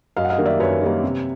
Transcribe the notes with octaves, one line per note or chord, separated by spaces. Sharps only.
F#2 D#5 F5
F#5
D#5 F5
D#3 G3 A#3
D5 E5
F#2 B4 C#5
D#3 G3 A#3
C3